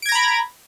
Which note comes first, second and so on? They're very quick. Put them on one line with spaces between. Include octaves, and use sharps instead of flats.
D7 G#6 A#6 A#5 B5